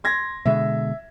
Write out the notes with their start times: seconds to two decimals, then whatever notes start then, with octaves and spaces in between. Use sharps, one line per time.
0.04 C6 G#6 A#6
0.46 B2 D3 G#3 E5